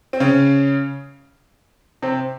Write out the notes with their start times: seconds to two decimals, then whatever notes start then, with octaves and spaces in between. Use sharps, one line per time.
0.13 C4
0.20 C#3 C#4
2.02 C3 C4